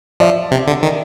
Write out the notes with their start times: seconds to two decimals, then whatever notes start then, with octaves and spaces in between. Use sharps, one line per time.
0.20 F3 D5 E5
0.51 C3
0.67 D3
0.83 D#3